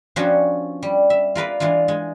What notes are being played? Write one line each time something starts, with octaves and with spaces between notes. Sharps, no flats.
F3 B3 C#4 D4 F#4 G5
G3
E5
F4 A#4 B4 D5
E3 G#3 D4 F4
G#3